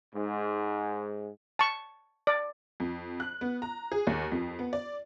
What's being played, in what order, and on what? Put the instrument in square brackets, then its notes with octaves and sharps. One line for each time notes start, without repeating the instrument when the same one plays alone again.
[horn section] G#2
[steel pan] A5 C#6
D5
[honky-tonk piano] F2
F#6
B3
A#5
G#4
D#2
F2
B3
D5